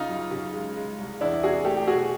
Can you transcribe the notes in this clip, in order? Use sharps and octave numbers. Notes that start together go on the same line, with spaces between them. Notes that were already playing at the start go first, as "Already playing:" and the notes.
Already playing: C#3 D#4 F4
F#2
C#3
G#3
G#3
C2
E2 D4 E4
C3 F#4 G#4
A3 G4 A4
G4
B2 F#4 G#4